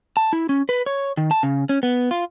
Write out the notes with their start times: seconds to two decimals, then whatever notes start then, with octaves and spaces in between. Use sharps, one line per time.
0.17 A5
0.33 E4
0.49 C#4
0.69 B4
0.86 C#5
1.17 D#3
1.31 A5
1.43 C#3
1.69 C#4
1.83 B3
2.11 F4